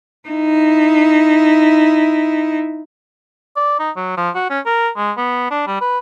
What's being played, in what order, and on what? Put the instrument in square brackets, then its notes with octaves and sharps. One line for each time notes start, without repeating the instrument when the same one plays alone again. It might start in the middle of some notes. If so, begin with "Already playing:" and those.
[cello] D#4 E4
[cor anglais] D5
D#4
F#3
F3
F#4
C#4
A#4
G#3
B3
D4
G3
B4